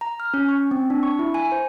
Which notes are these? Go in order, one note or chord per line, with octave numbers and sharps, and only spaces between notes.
A#5
F6
C#4
C#6
C4
D4
C#6
E4
G#5
C5